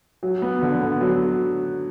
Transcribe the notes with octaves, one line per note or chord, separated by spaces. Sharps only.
F#3
B3
D3
B3
F#3